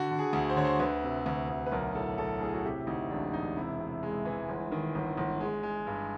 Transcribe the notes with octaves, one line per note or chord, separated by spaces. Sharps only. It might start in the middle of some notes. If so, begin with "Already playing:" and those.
Already playing: D3 F#4
D3
G#4
D2
C5
D3 C#5
C5
D2 B4
C3
D2
D2
B4
B1 A#4
A2 A4
B1 A4
A2 G#4
F#4
C3 G4
D2 D#4
E1 D4
E1 D#4
C3 E4
C3
G#3
E3
G1
D#3
G1
G1
G#3
G#3
G2